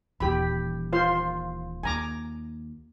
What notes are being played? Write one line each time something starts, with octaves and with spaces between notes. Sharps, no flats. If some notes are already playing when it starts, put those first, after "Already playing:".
D#1 E3 G4 B5
F4 C5 C6
D#2 G#5 A#5 D6